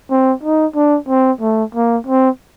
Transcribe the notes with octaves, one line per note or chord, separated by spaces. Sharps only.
C4
D#4
D4
C4
A3
A#3
C4